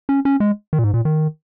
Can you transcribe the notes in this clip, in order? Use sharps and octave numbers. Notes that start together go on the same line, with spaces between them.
C#4
C#4
G#3
D#3
A#2
G#2
A#2
D#3